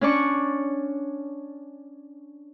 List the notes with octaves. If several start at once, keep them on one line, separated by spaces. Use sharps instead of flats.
C#4 D4 D5 C#6